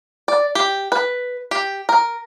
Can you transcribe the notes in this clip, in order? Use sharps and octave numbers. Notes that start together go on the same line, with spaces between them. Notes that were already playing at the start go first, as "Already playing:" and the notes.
D5
G4
B4
G4
A#4